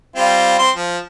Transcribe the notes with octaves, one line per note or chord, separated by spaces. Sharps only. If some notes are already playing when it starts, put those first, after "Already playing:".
G3 C4 F4
C4 C6
F3